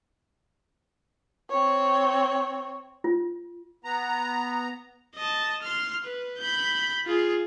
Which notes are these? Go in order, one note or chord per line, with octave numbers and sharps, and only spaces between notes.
C4 C#5
F4
B3 A#5
D#5 A5
C6 F6
B4
B5 G6
F4 G#4